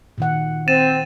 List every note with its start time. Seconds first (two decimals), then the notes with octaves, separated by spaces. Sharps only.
0.18 A#2 D#3 F#5
0.68 C4 A6 D#7 E7